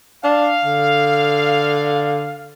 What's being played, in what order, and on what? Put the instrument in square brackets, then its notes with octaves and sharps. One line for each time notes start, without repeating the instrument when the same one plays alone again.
[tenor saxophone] D4 [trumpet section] F5
[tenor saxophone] D3